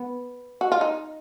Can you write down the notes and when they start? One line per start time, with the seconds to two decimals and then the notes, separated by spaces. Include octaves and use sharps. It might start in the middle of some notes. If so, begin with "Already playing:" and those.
Already playing: B3
0.61 F#4
0.72 F4
0.81 D#4